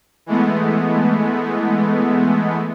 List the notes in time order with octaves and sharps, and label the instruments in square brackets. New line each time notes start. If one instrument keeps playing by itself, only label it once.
[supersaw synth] E3 G#3 A3 B3